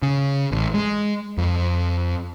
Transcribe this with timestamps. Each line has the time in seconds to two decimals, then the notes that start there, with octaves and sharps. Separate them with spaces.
0.02 C#3
0.52 A1
0.74 G#3
1.38 F2